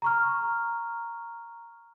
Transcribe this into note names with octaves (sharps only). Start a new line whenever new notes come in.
A#5 C#6 F6